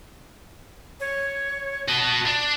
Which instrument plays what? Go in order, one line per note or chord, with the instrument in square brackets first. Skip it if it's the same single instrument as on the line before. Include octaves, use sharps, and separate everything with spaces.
[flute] C#5
[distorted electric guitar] F#4 D#5 [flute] A5
[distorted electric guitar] D4